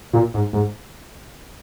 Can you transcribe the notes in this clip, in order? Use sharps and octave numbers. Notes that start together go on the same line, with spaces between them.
A#2
G#2
G#2